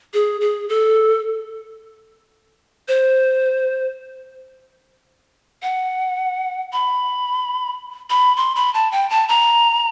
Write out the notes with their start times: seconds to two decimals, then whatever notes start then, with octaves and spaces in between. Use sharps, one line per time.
0.14 G#4
0.41 G#4
0.69 A4
2.88 C5
5.62 F#5
6.73 B5
8.10 B5
8.37 C6
8.56 B5
8.74 A5
8.92 G5
9.10 A5
9.29 A#5